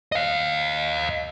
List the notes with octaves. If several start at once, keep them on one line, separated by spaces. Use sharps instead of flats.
D#5 F5